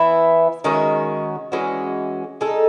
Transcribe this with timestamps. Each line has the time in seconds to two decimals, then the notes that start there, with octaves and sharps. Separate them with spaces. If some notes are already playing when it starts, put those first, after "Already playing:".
Already playing: E3 B3 E4
0.64 D#3 G#3 C#4 F#4
1.52 E3 G#3 C#4 F#4
2.41 G#3 D#4 A4